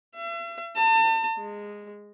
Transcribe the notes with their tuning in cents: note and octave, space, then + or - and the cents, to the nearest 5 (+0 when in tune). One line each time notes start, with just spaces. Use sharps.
E5 +45
A5 +35
G#3 -10